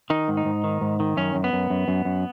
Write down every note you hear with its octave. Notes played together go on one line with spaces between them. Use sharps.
D#3 D#4
G#2
D#4
G#2
D#3
G#2
D#3
F#2 C#4
F#2
B3
F#2
F#2
F#2
F#2